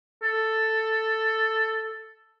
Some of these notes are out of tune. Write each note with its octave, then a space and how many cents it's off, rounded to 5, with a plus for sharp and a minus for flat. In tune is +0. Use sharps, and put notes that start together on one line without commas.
A4 +5